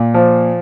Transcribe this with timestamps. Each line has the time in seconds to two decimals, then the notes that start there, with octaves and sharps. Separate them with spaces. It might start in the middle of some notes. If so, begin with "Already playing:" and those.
Already playing: A#2
0.14 F3